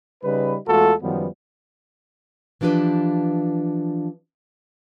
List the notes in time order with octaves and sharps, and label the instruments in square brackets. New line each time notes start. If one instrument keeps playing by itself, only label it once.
[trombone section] C#3 G3 D#4 B4
E2 G#3 A3 F4 F#4 A4
F#2 D#3 F3 G3 B3
[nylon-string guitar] E3 F3 D4 G4 B4